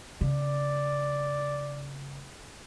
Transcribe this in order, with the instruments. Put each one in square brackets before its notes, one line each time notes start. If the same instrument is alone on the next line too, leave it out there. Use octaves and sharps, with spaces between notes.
[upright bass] C#3 [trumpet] D5